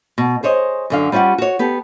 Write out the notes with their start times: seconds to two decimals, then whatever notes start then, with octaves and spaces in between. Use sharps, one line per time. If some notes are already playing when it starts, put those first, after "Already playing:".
0.18 B2
0.43 G#4 C5 C#5 D#5
0.90 F#2 D3 F5
1.12 G3 C#4 F4 G4 F#5
1.38 F#4 C#5
1.59 B3 G4 A4